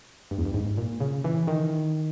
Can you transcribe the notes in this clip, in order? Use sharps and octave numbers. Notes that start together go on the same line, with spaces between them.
G2
E2
G2
G#2
A#2
C#3
E3
D#3